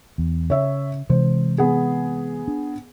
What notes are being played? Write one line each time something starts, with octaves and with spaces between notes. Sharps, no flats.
E2
C#3 C#5 E5
C3 E3 G#3 C5
B3 G#4
D4